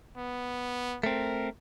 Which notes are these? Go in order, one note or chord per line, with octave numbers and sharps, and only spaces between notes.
B3
A3 C4 A#4